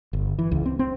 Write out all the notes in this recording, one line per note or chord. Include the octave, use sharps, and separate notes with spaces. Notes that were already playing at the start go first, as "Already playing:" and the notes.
G1
E3
C#2
C4
C4